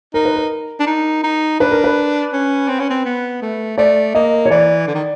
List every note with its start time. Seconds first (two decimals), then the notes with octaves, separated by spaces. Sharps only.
0.14 D#4 A#4
0.25 B4
0.36 A#4
0.80 D4
0.87 D#4
1.24 D#4
1.60 D4 B4
1.71 A#4
1.84 B4
2.33 C#4
2.68 C4
2.80 C#4
2.90 C4
3.05 B3
3.42 A3
3.78 A3 D5
4.15 A#3 D#5
4.46 C#5
4.51 E3 D5
4.87 D3
4.95 D#3